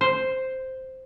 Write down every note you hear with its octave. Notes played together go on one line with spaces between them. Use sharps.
C5